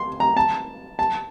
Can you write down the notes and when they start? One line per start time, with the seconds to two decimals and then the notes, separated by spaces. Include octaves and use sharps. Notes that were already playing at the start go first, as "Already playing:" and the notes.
Already playing: C6
0.20 A#5
0.37 A5
0.99 A5